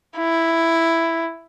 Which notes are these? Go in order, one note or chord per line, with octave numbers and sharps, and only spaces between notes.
E4